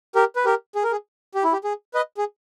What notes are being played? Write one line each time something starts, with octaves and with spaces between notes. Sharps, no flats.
G4 A#4
B4
G4 A#4
G#4
A#4
G#4
G4
E4
G4
G#4
B4 D#5
G#4